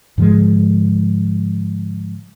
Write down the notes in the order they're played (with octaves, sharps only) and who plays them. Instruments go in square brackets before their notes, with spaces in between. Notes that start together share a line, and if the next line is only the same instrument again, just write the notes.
[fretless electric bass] G#2 D3 F3 G#3